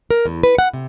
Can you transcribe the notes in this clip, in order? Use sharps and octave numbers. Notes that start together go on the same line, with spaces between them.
A#4
E2
B4
F#5
C3